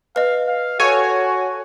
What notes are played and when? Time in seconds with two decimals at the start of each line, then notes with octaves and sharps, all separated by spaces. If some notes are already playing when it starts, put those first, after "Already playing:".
0.16 B4 D#5 F5
0.48 F5
0.80 F#4 A4 C#5 G#5